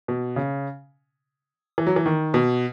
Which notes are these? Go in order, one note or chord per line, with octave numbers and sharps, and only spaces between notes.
B2
C#3
E3
F#3
E3
D#3
B2